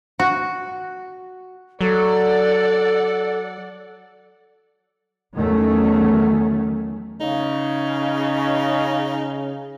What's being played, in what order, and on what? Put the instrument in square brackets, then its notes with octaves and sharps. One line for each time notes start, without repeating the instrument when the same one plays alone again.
[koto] F#4
[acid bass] F#3 [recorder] A4 [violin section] D5 F#5
[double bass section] E2 D#3 F#3 A3 C#4
[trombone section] C#3 [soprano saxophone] D#4